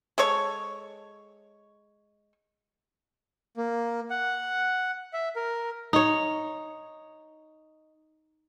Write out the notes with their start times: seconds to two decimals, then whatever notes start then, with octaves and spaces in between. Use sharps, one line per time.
0.18 G#3 A4 C#5 C#6
3.57 A#3
4.10 F#5
5.13 E5
5.36 A#4
5.93 D#4 C#5